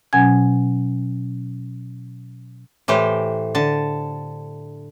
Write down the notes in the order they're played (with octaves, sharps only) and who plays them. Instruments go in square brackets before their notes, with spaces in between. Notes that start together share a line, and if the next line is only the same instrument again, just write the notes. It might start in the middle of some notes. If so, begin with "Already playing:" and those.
[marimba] B2 F#3 C#4 F#5 G#5 G#6
[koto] A2 E3 G4 C5
D3 A5